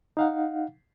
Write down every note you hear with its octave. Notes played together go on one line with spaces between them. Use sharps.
D#4 F5 F#5